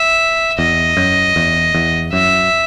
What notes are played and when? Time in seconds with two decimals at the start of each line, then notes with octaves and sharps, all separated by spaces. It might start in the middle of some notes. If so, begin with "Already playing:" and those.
Already playing: E5
0.58 E2 D#5
0.97 F#2
1.36 E2
1.75 E2
2.13 F#2 E5